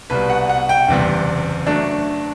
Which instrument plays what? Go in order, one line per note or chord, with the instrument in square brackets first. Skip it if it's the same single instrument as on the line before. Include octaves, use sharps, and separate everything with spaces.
[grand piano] C2 B2 G3 B4
F#5
F#5
G5
F#1 E2 C3 G3
F#3 A3 D4